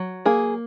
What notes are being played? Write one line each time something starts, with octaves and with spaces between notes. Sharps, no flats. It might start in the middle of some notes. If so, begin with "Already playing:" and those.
Already playing: F#3
A#3 G#4